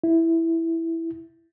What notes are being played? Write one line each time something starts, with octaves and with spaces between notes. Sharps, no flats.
E4